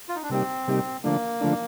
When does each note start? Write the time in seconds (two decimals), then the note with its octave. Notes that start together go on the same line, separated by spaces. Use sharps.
0.09 F4
0.16 D#4
0.23 D4
0.30 C3 G3 A#3 C4 D#4 G4
0.68 C3 G3 A#3 D#4 G4
1.04 D3 F3 A3 A#3 D4
1.41 D3 F3 A3 D4